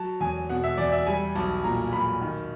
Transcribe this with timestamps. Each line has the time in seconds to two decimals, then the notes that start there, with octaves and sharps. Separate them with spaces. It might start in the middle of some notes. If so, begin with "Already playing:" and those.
Already playing: F#3 A5
0.20 E2 G#5
0.50 B2 F#5
0.64 E5
0.77 E2 D5
0.92 E5
1.07 G3 G#5
1.35 B1 A5
1.64 A#2 A#5
1.93 B1 B5
2.21 D#3